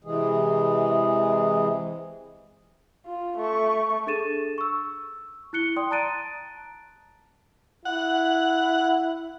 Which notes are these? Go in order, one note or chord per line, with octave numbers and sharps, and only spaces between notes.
C3 E3 G#3 G#4
F4
A3 C#6
D4 G#4 A4 A6 D#7 E7
C#6 E6
E4 F#6 C#7 G7
D5 G5 C6 D#6
A5 A#5 F#6 A6 D7 D#7
E4 F#5